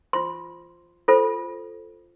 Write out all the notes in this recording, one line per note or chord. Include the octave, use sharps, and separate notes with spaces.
F4 C5 C6
F4 A4 C5